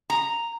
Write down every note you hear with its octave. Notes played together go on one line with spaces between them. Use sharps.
A#5